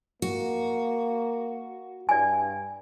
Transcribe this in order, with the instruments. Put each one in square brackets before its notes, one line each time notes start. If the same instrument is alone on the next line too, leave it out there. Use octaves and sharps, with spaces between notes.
[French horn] A#3 [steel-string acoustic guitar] F#4
[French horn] G2 [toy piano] D5 G#5